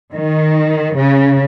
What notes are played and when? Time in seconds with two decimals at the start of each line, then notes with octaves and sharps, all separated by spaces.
0.13 D#3
0.96 C#3